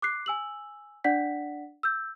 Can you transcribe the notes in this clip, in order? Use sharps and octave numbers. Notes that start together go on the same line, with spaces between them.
D6 F#6 C7
G#5 E6 F#7
D4 D5 F#5 B6
E6 G6